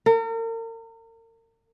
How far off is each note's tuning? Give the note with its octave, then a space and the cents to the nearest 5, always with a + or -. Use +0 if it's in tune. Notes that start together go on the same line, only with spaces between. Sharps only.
A#4 -40